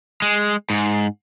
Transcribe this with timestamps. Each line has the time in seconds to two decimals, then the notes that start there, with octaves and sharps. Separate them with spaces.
0.22 G#3
0.70 G#2